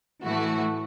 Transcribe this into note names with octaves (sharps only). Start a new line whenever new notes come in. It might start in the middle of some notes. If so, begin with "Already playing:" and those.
A2 E3 A3 F#4